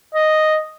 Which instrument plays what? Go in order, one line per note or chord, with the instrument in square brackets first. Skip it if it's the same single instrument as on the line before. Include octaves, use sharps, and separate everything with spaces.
[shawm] D#5